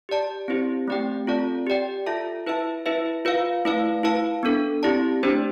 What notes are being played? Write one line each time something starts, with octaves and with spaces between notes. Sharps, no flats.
G4 D5 A5
C4 E4 G4 C5
A3 C4 G4 D5 G5
C4 F4 A4 D5 A5
G4 D5 G5
F4 A4 E5 A5
E4 B4 E5 A5
E4 B4 E5
F4 B4 F5
A3 E4 B4 F5
E4 B4 F5 A5
B3 D4 A4
C4 E4 G4 D5 A5
A3 D4 G4 C5